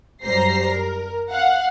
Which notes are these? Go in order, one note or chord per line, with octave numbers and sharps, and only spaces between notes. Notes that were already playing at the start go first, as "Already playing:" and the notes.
F#2 G3 C5 A#5 A#6 C7
A#4
F5 F#5